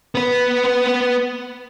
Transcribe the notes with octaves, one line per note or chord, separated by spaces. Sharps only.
B3 B4